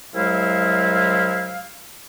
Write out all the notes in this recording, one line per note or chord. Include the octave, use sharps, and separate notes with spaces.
C2 F#3 G#3 E4 F5